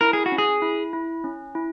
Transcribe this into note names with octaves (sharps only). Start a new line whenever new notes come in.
E4 A#4
G#4
F#4
C#4
G#4
E4
E4
C#4
E4